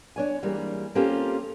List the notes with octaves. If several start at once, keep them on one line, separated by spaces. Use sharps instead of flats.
D4 C#5 G#5
E3 G3 G#3 A#3
A#3 C4 C#4 F4 G4 A4